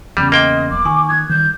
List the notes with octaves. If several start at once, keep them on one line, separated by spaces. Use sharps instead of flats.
E2 C#3 G3
A#3 D#5 F5 G5 C6
E1 B1 D6
D#3 G#5 C#6 D#6
D6 D#6 F#6 G#6
D#3 G3 G6